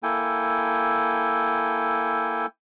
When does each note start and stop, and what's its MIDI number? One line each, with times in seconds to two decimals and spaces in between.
0.03 2.46 58
0.03 2.46 64
0.03 2.46 69
0.03 2.46 79
0.03 2.46 80